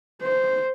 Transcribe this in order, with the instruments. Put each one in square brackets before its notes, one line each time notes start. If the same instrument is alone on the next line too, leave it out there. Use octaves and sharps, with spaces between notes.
[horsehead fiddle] C5